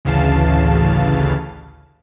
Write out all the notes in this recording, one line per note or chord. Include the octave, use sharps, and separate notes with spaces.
A1 D2 C#3 E3 F5 A5